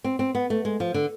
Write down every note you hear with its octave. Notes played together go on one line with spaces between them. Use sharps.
C4
C4
B3
A3
G#3
F3
D3